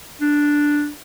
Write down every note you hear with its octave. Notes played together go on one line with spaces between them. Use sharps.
D4